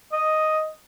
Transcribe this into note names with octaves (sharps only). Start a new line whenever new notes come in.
D#5